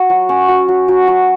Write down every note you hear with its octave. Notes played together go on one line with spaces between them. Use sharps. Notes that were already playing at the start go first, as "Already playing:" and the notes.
Already playing: F#4
F#3
C#4
F#4
F#3
F#3
F#3